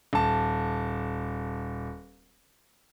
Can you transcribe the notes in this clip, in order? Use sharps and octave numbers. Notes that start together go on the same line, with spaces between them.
D#1 A5